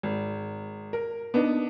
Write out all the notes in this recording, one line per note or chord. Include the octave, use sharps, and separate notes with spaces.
G#1
A#4
B3 D4 D#4